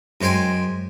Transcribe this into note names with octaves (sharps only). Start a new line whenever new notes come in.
F#2 G#3 C5 G5 G#5